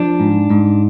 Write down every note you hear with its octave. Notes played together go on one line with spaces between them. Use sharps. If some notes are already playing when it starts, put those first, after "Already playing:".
Already playing: F3 D4
G#2
G#2